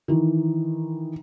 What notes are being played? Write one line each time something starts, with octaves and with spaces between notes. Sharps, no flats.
D#3 E3